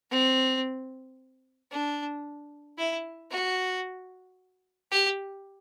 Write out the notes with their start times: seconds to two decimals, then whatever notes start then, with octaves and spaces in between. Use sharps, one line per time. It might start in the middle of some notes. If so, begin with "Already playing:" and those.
0.11 C4
1.72 D4
2.78 E4
3.31 F#4
4.92 G4